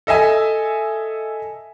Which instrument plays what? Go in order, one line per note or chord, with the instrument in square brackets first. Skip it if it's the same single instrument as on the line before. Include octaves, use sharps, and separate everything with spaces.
[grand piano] A4 D#5 E5 G#5